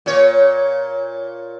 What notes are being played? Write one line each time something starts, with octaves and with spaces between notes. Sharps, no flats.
A#2 C#5